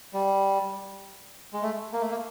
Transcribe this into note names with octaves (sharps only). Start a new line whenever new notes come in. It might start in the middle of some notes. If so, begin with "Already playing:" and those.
G3
G#3
A3
A#3
A3
A#3